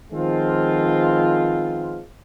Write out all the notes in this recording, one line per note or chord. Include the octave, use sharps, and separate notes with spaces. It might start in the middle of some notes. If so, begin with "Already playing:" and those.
D#3 F3 G#3 B3 C4 F4